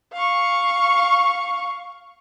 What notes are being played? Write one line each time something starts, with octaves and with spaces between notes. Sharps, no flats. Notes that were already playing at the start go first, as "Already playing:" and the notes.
F5 C#6